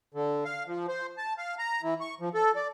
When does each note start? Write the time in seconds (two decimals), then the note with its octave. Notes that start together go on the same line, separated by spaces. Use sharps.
0.14 D3
0.45 F5
0.67 F3
0.88 C5
1.18 A5
1.38 F5
1.59 A#5
1.82 E3
2.01 C#6
2.21 F3
2.34 A4
2.56 D5